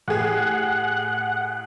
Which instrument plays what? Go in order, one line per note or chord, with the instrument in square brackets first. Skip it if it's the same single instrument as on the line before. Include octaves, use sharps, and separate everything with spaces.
[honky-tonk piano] A2 G4 G#4 [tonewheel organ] F#5